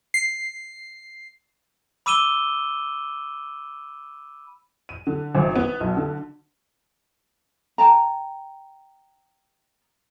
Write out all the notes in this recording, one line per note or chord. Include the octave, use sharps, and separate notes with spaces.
C7
B5 D6 E6 D#7 E7 G7
D#7
D3
G#1
B3
B1
D3
G5 A5 A#5